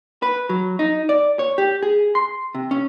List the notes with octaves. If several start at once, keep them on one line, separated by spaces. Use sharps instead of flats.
B4
F#3
D#4
D5
C#5
G4
G#4
C6
C3
C#4